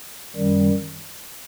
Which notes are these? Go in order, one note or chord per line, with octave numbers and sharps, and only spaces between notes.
F#2 D#3 G3